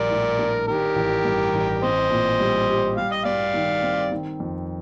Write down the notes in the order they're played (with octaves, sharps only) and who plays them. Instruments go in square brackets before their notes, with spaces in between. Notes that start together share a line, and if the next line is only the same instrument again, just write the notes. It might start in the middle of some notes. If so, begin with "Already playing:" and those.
Already playing: [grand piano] A#1 G3 [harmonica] A#4 D5
[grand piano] A2
D4
[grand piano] D#3 [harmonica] G4 A#4
[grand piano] A1
G2
A1
[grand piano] C4 [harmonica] C5 D#5
[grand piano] A#2
G3
G4
[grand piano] G3 [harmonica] F5
[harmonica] D#5
[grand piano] G2 [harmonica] D5 F5
[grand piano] D#3
C4
D#3
F2